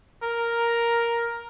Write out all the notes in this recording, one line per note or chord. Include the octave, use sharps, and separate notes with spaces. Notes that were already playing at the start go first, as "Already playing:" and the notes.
A#4